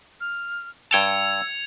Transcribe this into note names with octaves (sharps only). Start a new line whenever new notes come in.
F6
G2 G5 A5 E6 G#6 C#7 F7